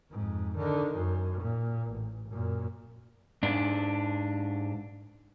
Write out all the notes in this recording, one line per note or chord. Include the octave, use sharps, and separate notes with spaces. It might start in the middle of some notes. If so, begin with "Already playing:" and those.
F2 G#2
D3 D#3
F#2
A#2
A1
F#2 A#2
G#2 D4